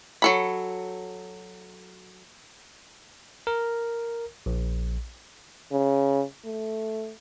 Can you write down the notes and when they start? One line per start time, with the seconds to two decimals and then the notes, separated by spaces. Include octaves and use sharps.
0.22 F#3 A4 B5
3.47 A#4
4.46 A#1
5.72 C#3
6.45 A3